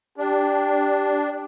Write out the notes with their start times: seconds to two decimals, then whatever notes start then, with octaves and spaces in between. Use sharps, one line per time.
0.18 D4 G4